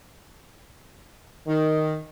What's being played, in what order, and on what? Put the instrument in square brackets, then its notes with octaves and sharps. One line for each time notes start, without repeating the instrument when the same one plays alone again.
[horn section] D#3